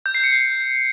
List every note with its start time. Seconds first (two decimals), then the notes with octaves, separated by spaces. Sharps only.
0.06 G6
0.15 C7
0.23 C#7
0.32 C7